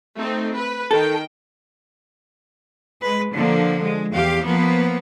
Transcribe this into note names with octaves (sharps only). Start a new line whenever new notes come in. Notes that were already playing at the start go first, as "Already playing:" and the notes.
A3 C4 D#4
B4
D#3 A4 G5
G#3 B4
D3 F3 A#3
G#3
E2 G4 F5
F3 A#3 B3